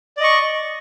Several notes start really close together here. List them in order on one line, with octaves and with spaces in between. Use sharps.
D5 D#5 C#6